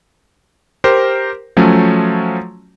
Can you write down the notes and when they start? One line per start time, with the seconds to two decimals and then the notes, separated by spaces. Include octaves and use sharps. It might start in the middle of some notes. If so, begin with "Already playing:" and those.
0.84 G4 A#4 C5
1.57 F3 F#3 A3 C#4